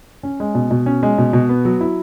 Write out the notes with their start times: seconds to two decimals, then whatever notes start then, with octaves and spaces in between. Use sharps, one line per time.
0.23 C#4
0.40 G#3
0.55 B2
0.71 B2
0.86 C#4
1.03 G#3
1.18 B2
1.33 B2
1.49 B3
1.65 F#3
1.81 E4